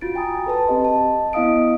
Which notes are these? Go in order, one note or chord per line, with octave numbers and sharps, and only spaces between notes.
F4 F#4 A6 D7
G5 G#5 A#5 B5 D#6
A4 B4 A5
C4 G4 D#5 C6
D#5 A5
B3 E4 D#5 F5 D#6 D7